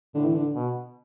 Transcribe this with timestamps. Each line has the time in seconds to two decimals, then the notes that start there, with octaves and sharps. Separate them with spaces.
0.14 A2 D3
0.25 E3
0.35 D3
0.55 B2